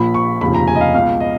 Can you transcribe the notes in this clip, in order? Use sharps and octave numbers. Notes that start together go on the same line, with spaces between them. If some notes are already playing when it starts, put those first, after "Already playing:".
Already playing: A#1 A#2 F3 B5
C#6
F1 D#2 C#3 F3 B5
A#5
G#5
D#5
F5
C#2 B2 F5
D#5